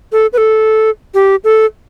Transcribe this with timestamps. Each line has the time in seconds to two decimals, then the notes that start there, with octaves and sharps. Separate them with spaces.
0.12 A4
0.33 B4
0.38 A4
1.14 G4
1.44 A4